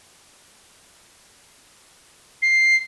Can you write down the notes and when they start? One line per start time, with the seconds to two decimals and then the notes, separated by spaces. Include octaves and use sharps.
2.42 C7